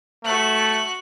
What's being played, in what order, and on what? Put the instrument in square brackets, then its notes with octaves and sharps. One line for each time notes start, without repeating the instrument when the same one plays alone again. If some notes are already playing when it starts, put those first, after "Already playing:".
[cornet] A3 [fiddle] F#4 F#6